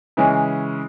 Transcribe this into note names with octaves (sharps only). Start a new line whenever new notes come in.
C#3 E3 G#3 C#4 G#4